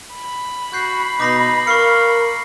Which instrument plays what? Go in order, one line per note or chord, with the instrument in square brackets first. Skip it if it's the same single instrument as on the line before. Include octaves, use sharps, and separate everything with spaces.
[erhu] B5
[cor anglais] F#4 [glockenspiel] G6 C7
[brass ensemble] B2 [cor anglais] D#4 [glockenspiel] D6 A#6 C7
[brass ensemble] A#4 [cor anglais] F5 [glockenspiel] C#6 C7 C#7